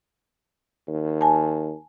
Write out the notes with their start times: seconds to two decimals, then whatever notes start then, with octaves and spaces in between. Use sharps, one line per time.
0.87 D#2
1.21 G#5 A5